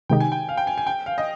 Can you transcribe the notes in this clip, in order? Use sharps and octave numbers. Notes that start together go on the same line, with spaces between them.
C3 D#3 G#3 D#4 G4 G5
G#5
G5
F5
G5
G#5
G#5
G5
F5
D#5